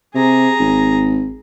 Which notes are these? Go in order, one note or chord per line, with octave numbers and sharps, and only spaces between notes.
C3 G#4 A#5
G#1